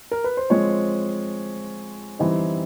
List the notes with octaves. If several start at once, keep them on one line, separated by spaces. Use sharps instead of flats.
A#4
B4
C5
F3 G#3 C4 C#5
E3 G3 C4 D#4